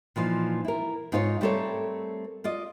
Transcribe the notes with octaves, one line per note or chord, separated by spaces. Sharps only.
A#2 E3 F3 D#4
E4 A#4
G#2 D#4 F4 C5 C#5
G3 A3 C4 A4 A#4 C#5
F4 D5 D#5